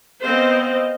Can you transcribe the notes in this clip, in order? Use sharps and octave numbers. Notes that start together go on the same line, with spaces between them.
B3 C4 C5 D#5 F5